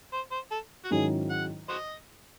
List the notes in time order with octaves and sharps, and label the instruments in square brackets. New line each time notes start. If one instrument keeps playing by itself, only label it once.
[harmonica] C5
C5
A4
F#4
[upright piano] G#2 D#3 F#3 C#4 E4 [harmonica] G#4
[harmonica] F#5
F#4 C5 D#5